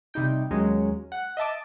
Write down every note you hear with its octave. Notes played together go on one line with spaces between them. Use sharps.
C3 G3 D#4 G5
D#2 F#3 G#3 C#4
F#5
D#5 E5 A5 D6